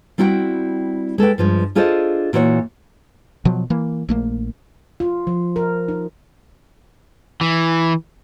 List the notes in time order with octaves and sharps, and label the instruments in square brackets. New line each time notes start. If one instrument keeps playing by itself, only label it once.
[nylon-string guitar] G3 C4 E4 F#4 F#5 G5
G#3 A4 B4 G5
G2 F3 G#3
D4 F4 G#4 A4 C5 D#5
A#2 E3 F#4 B4 C#5
[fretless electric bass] B2 F3 F#3
E3 A#3
A#1 A3 A#3
[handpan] F4
F3
A#4
D#4
[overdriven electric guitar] E3